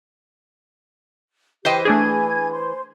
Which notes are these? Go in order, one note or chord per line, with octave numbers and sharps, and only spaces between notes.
E3 G4 B4 C5 D#5 G5
A3 D4 G#4 G#5 G#6
C5 C6